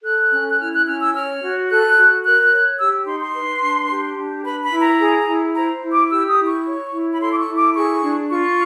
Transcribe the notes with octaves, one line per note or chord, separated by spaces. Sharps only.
A4 F#6
C#4
F#6
E4 F6
F#6
C#4 F6
E6
C#5 F6
F#4
A4 F#6
F#4
A#4 F#6
C#5
G4 E6
D#4 C6
C6
B4
D4
G4
D4
B4 B5
B5
E4
A#5
G#4
E4
C5 A#5
E4
D6
G4 E6
D#6
E4
C#6
C#5
E4
B5
A4 C6
D6
C#6
E4
D6
G#4 C#6
D4
F4 C#6